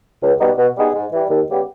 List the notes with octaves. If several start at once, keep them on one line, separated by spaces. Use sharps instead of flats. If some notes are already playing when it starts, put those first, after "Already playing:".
C#2
B2 G3 B3 D#4
B2
G3 B3 D#4 G#4
G#2
E3 G3
D#2
C#3 G3 B3 G4